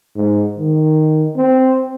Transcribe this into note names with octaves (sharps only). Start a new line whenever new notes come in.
G#2
D#3
C4